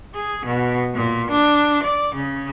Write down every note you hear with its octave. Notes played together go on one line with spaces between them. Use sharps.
G#4
B2
A#2
D4
D5
C#3